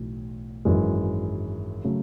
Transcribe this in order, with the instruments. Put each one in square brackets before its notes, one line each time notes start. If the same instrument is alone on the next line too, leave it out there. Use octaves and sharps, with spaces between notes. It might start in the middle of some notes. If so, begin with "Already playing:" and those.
Already playing: [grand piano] B1 A2 E3
G#1 F#2 E3 G#3
C#3 F#3 A3